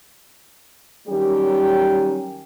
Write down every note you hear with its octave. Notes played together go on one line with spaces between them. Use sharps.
D#3 F#3 G3 C#4 G4